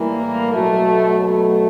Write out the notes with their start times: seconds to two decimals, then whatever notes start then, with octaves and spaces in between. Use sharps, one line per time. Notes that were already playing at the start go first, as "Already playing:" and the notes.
Already playing: A2 E3 G3 A#3
0.51 B2 F#3 A3
1.24 A3